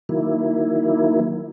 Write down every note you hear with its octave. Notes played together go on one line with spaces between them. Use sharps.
D#3 F#3 A#3 E4